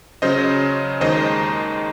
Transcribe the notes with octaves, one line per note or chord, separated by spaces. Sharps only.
C#3 F#3 C#4 C5 D#5
D#2 D#3 G#3 D#4 C5 D#5